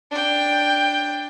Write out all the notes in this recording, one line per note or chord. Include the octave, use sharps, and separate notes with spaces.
D4 G5